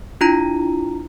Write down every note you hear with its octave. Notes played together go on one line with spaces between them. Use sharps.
D4 E4 F4 A#5